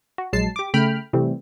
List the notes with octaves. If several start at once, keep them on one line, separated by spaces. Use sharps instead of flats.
F#4
A#1 F#3 G#3 A5 C7
G4 D6
C#3 A3 G5 B5 F6
C3 E3 G3 A3 C4